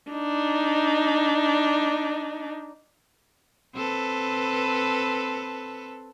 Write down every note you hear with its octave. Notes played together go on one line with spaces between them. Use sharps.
D4 D#4
C4 A4 B4